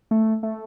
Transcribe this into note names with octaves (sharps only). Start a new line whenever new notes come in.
A3
A3